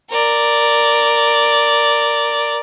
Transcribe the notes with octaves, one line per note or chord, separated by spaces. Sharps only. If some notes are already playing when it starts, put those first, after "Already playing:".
A#4 D5